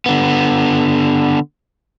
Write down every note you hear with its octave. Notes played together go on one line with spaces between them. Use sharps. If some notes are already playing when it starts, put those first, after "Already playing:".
D3 B3